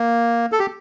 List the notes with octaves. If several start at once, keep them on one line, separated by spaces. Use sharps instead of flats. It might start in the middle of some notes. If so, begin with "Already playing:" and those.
Already playing: A#3
A4
G4